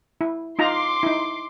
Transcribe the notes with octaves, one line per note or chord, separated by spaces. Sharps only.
E4
D#4 F4 A#5 C6 D6
D#4 E4